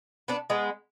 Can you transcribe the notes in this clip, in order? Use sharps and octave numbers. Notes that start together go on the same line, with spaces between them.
B3 D4
G#3 B3